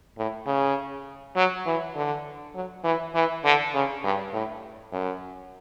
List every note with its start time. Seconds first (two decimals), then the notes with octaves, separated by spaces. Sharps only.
0.18 A2
0.47 C#3
1.36 F#3
1.66 E3
1.96 D3
2.55 F#3
2.84 E3
3.15 E3
3.45 D3
3.74 C#3
4.04 G2
4.33 A2
4.92 F#2